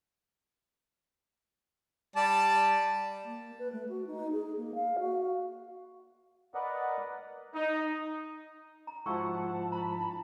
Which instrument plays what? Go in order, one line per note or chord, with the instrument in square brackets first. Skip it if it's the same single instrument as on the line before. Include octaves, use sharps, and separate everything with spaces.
[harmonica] G3 D5 A5
[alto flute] A#3
B4
A3
F#4
D#4
G#4
A#3
F5
F#4
[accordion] A#4 B4 D5 D#5 F#5
[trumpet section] D#4
[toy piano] A#5
[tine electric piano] G#2 F3 E4 [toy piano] F#4 C#6 E6 [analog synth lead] F#5 [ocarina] A5
[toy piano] A#5 [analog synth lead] B5
[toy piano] E4 F4